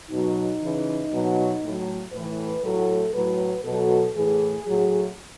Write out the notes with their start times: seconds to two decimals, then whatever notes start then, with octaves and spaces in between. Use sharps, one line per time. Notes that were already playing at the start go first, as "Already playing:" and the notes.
0.10 B2 F#3 D#4
0.61 C#3 E3
1.12 B2 F#3
1.62 A2 F#3
2.13 A2 E3 B4
2.63 A2 F#3 A4
3.13 A2 F#3 B4
3.64 B2 F#3 A4
4.15 A2 E3 G#4
4.65 A2 F#3